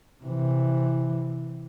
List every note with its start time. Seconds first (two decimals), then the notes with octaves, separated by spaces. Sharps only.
0.24 C3 E3